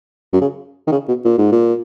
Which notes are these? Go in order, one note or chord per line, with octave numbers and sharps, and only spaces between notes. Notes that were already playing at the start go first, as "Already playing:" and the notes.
F#2
C#3
D#3
C#3
B2
A#2
G#2
A#2